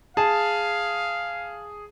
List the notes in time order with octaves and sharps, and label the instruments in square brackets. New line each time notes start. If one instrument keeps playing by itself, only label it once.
[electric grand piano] G#4 [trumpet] F5 [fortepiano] A5